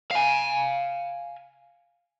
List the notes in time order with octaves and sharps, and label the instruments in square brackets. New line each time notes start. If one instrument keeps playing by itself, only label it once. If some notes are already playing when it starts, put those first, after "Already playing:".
[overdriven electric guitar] F5 G#5